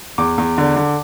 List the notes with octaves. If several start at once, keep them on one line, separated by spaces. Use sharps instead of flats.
E2 D6
E2
D3
D3